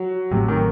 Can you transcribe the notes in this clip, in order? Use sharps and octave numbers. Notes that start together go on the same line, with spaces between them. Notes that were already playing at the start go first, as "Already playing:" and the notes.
Already playing: F#3
A1 A2 C3 F#3 A3
D#3